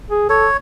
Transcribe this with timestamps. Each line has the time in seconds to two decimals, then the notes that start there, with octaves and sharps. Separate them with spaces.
0.11 G#4
0.29 A4 C#5